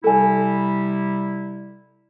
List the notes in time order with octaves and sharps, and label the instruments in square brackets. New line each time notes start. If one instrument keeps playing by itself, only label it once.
[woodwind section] C3 G3 E4 [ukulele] A4 G#5